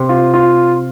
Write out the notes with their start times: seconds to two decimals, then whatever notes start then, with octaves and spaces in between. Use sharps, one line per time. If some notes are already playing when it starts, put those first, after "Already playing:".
Already playing: C3
0.09 F4
0.34 F4